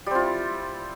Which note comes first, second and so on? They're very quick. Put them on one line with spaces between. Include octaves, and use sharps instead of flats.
G3 C4 F4 E4